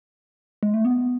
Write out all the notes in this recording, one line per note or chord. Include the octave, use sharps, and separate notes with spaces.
G#3
A3
B3